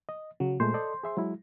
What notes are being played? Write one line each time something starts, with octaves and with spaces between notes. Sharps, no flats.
D#5
C#3 F#3
A#2 G#3 A3 C5
A4 D5 D#5
G#4 E5 C6
F#3 G#3 E4